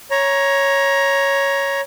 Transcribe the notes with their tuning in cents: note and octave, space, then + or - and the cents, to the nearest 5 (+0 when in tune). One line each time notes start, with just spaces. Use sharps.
C#5 +0 A#5 +15